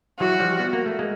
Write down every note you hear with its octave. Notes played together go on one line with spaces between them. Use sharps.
E3 F#3 F#4
F3 G3
B3
A#3
A3
G#3 A#3